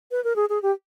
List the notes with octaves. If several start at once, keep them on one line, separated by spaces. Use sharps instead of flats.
B4
A#4
G#4
G#4
G4